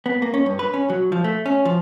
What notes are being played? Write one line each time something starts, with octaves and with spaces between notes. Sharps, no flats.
B3
A#3
C#4
G2
B4
C#4
F#3
F3
A3
C#4
F3